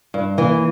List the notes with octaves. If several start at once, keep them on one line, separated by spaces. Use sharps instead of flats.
G2
E3 A#3